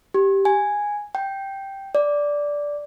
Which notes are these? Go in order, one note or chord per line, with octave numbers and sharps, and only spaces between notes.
G4
G#5
G5
D5